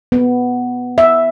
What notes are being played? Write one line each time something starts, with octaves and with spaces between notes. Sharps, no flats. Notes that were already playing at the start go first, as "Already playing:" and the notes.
B3
E5